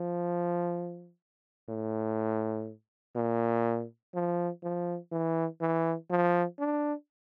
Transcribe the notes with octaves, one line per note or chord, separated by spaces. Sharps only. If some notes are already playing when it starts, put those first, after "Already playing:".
Already playing: F3
A2
A#2
F3
F3
E3
E3
F3
D4